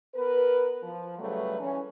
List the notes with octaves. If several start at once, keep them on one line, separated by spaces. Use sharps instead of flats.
B3 A#4 B4
F3
C#3 F#3 G3 A3 B4
E3 C#4